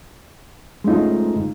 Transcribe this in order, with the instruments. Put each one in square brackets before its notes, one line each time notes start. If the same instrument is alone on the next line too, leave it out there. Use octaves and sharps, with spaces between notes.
[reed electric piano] G#3 A3 C#4 D#4 F4